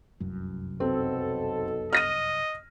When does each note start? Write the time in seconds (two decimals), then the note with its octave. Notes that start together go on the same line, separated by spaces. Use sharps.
0.20 F1 C2 F#2
0.80 B1 B2 C4 A4
1.93 D#5 F6 A#6 D#7